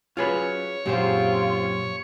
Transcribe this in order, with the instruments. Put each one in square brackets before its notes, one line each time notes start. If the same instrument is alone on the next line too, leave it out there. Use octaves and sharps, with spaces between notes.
[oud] F#3 C#4 [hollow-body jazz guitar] F4 G#4 B4 [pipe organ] C#5
[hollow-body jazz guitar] F#2 A#2 [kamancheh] C4 F4 [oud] G4 G#4 C5